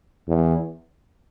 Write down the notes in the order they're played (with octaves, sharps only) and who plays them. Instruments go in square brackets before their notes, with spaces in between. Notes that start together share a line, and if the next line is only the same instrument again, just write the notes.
[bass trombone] E2